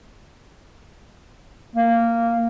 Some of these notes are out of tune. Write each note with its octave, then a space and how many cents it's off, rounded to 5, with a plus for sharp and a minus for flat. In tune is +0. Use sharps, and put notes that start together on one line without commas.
A#3 -15